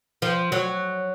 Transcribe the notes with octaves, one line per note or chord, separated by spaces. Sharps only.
F3
F#3